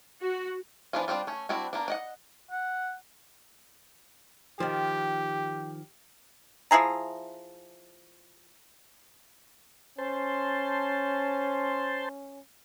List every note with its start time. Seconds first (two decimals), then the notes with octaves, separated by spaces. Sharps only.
0.21 F#4
0.93 E3 F3 B3 D4 F4
1.08 G3 C4 D4 F4
1.27 A3 C#4
1.49 G3 C4 D4 E4 F#4
1.73 A#3 B3 D4
1.88 D4 D#5 F#5
2.51 F#5
4.60 D#3 F3 G4
6.71 F3 E4 G#4 A#5
9.98 C#4 C5 A5 C6